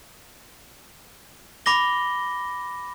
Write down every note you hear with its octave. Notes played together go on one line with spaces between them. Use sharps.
B5 D6 A#6 G7